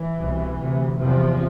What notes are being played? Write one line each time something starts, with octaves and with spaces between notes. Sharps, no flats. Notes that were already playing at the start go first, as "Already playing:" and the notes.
Already playing: E3
C2 B2
D2 C3
E2 C3 F3